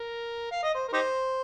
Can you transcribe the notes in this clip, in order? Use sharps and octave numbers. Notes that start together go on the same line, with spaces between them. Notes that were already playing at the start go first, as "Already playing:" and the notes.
Already playing: A#4
F5
D#5
C5
A#4
D#4 G4 C5